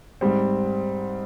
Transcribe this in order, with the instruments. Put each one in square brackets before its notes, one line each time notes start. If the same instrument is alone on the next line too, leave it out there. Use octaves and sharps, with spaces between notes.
[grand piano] G#2 G3 C4